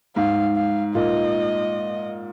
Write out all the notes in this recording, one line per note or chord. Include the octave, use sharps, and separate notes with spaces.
G#2 F5
F5
A#2 D#5